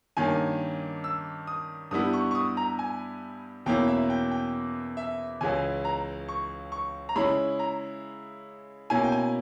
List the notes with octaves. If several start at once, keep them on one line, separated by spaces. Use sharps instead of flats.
G2 D#3 A#3 C#4 G#5
E6
D#6
G2 G3 B3 E4 D#6
C#6
C#6
D#6
A#5
G#5
E2 B2 A#3 C#4 E4 G5
E5
G5
G5
E5
C#2 C#3 E3 G#5
A#5
C#6
C#6
A#5
C#3 G#3 C#4 E4 B5
A#5
B2 A#3 C#4 E4 G#5
G5
G#5